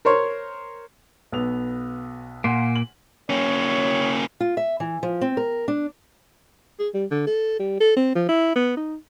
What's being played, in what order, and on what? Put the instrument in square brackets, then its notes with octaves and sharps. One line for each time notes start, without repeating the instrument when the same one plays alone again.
[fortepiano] A#4 C5 C#5
[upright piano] B1 B3 F7
[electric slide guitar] A#2 A#3 [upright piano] F#5 G#5 C6
[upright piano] F#7
[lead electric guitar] A#3 C#4 [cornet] C#5
[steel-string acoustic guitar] F4
E5
E3
F3
C4
A#4
D4
[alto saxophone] G#4
G3
D3
A4
G3
A4
C4
F3
E4
B3
D#4